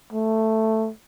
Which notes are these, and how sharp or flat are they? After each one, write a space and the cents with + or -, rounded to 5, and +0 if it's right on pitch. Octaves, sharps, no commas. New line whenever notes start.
A3 +5